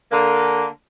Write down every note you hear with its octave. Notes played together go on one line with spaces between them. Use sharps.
D3 A#3